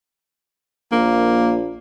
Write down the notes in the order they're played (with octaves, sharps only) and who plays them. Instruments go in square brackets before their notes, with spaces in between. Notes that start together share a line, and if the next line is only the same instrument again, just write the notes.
[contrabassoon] A#1 [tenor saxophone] A#3